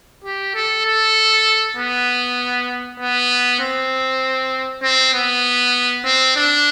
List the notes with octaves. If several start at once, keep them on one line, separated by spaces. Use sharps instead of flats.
G4
A4
A4
B3
B3
C4
C4
B3
C4
D4